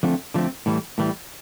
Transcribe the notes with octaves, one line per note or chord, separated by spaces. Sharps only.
D3 F3 A3 C4
D3 F3 A3 C4
A2 E3 G3
A2 E3 G3